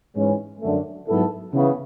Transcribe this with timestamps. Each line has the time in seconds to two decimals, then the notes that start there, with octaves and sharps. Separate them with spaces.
0.15 G#2 E3 G#3 C#4
0.61 F#2 D3 A3
1.07 G#2 F#3 B3 E4 A4
1.52 C#3 E3 B3